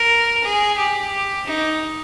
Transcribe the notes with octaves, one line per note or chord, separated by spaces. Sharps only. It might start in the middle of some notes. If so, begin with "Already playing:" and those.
Already playing: A#4
G#4
G4
D#4